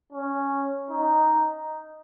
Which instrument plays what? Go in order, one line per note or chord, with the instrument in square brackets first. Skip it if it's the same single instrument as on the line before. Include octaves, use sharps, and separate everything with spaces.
[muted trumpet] C#4
D#4